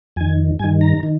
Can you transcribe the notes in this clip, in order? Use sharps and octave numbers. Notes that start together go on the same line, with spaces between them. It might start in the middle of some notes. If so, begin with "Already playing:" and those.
F2 D#3 G#5
G2 D#3 G#5
A#5
D#3